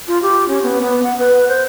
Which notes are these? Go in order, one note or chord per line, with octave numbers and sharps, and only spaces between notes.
F4
G4
C#4
B3
B3
F#5
B4
C5